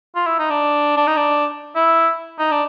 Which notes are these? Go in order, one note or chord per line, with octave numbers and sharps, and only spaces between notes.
F4
E4
D#4
D4
D4
D#4
D4
E4
D#4
D4